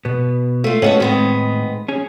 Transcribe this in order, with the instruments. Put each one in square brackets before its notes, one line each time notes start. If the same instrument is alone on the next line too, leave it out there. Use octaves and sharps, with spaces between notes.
[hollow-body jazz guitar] B2 B3
[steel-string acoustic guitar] A3 F4
[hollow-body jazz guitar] G#2 B3 D#5 [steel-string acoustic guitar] C#4 F#4 A4
[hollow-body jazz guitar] A2 C4 [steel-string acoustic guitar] D#3 G#3 B3
[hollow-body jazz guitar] C#4 G#4